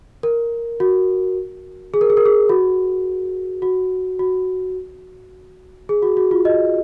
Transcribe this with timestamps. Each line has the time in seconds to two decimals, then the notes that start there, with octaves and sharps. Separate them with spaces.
0.23 A#4
0.80 F#4
1.94 G#4
2.01 A#4
2.10 G#4
2.17 A#4
2.26 G#4
2.49 F#4
3.62 F#4
4.19 F#4
5.89 G#4
6.02 F#4
6.17 F#4
6.31 F4
6.45 D#5